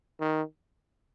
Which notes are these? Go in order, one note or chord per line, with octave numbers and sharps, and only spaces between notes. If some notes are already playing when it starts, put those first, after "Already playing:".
D#3